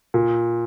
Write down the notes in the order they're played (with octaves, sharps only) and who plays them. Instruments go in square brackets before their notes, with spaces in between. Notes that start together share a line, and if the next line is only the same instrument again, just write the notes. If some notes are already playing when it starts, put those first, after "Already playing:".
[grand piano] A#2